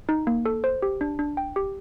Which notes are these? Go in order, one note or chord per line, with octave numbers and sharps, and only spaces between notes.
D#4
A#3
A4
C5
G4
D4
D4
G5
G4